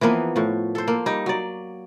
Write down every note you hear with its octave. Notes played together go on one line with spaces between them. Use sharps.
E3 F3 A#3 B3
A2 F3
A4 C5
A#3
G3 D#4
F#3 D5